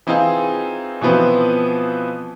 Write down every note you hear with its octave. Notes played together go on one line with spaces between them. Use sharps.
E3 C4 D#4 F4 G#4
B2 E3 F3 B3 C4